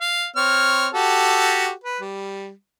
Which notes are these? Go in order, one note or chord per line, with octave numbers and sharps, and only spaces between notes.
F5
C4 C#5 F6
F#4 G4 A4
B4
G3